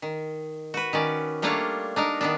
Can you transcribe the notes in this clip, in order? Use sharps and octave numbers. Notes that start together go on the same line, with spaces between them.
D#3
F#4 B4
D#3 C#4 D5
G3 A3 A#3 D4 F4 C#5
D4 D#4 A#4
D#3 B3 D4